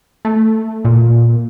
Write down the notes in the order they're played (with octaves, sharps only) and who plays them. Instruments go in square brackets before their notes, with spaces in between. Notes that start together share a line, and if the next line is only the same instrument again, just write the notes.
[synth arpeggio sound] A3
A#2